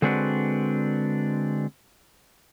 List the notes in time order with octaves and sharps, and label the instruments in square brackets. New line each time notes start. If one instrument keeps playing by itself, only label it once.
[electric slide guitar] D3 G#3 C4 D4 F#4 B4